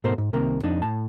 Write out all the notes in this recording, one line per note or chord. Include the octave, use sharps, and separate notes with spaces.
G#2 B2 A3 A#4 C5
G#2
C2 C3 D#3 A#3 A#4
F2 D4 D#4
A2 A5